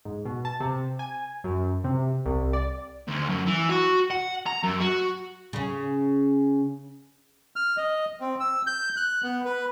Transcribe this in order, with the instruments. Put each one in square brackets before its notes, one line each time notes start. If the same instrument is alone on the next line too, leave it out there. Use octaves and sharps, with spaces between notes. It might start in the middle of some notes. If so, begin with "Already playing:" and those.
[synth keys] G#2
B2
A5
C3
G#5
F#2
C3
C2
D5
[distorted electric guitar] D2
F#2
E3
F#4
F#5
A#5
F#2
F#4
[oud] C#3 C#4
[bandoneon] F6
D#5
C4
E6
G6
F#6
B3
B4